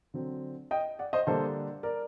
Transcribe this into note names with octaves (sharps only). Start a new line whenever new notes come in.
D3 F#3 C4
D#5 G5
D5 F#5
C5 D#5
D3 G3 A#3 D4 A4 C5
A#4 D5